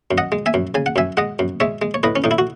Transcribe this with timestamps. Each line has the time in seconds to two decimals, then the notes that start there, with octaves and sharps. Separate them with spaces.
0.11 F#2
0.18 D#5 F#5
0.32 G#3
0.46 E5 G#5
0.54 F#2
0.75 C#3 G#5
0.86 F#5
0.96 F#2 E5 G#5
1.17 G#3 D#5 F#5
1.39 F#2
1.60 G#3 C#5 E5
1.82 G#3
1.94 C#5
2.03 A2 B4 D#5
2.16 C#4
2.24 A2 D#4
2.31 E4
2.38 F#4